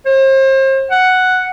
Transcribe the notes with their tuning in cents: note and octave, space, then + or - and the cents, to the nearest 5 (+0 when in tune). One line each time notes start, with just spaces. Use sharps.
C5 +35
F#5 +0